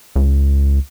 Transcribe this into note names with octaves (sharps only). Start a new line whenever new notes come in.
C#2